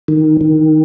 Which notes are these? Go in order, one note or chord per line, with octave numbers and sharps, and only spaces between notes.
D#3
D#3